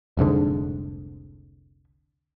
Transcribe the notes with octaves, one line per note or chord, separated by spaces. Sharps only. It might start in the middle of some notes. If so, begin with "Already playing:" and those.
F1 C2 G#2 D3